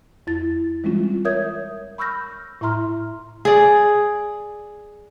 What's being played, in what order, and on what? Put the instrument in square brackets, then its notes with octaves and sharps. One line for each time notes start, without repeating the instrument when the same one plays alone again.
[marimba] F2 E4 A6
E3 G3 G#3 C4 C#4 F4
A#4 C#5 E5 D#6 G6 G#6
B5 C#6 E6 F6 G6 A#6
A2 E4 E5 A#5 C6 F6
[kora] G#4 D5